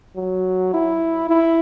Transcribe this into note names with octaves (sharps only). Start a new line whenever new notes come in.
F#3
E4
E4